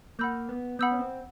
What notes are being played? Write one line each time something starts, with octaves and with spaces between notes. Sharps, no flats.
A#3 F#5 B5 E6 G6
B3
B3 F#5 B5 E6 G6
C#4
C4